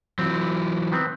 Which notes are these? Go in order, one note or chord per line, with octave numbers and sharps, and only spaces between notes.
E3 F#3 C4
D#3 B3 C4